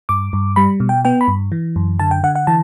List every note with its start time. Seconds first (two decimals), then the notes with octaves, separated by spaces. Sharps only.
0.09 G2 D6
0.33 G2
0.56 G3 B5
0.80 B2
0.89 G5
1.05 B3 G5
1.21 B5
1.28 G2
1.52 E3
1.76 F#2
1.99 D3 A5
2.11 G5
2.23 D3 F#5
2.35 F#5
2.47 E3 A5